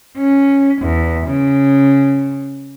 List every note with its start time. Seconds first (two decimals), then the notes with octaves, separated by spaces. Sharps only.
0.17 C#4
0.82 E2
1.26 C#3